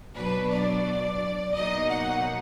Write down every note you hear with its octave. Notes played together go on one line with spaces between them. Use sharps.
B2 F#3 D4 B4
D5
B2 F#3 A#3 D#4 D#5
F#5